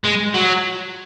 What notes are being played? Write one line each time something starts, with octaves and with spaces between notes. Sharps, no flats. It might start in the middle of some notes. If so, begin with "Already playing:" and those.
G#3
F#3